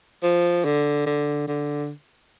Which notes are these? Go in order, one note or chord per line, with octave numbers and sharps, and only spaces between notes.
F3
D3
D3
D3